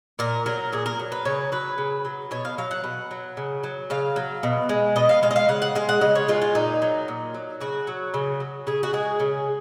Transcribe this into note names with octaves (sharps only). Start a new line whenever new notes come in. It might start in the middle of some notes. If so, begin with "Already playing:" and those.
A#2 A#4
F#3 A#4
A#2 G#4
A#4
F#3
B4
C#3 C#5
F#3 B4
C#3
F#3
B2 C#5
F5
F#3 F5
F#5
B2
F#3
C#3
F#3
C#3 F5
F#3
B2
G#3
B2 D#5
F5
G#3 F5
D#5
F5
C#3 F#5
F#5
G#3 F5
F#5
C#3 D#5
C#5
G#3 F4
F4
A#2 D#4
F#3
A#2
F#3
C#3 F#4
F#3
C#3
F#3
C#3 G#4
F#4
G#3 G#4
C#3